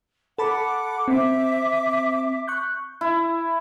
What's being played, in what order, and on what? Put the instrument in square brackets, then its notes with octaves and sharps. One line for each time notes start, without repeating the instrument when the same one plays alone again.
[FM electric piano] A4 A5 B5 [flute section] F#5 D6
[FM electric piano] C4 [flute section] E5 D6
[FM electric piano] C#6 F#6 G6
[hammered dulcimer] E4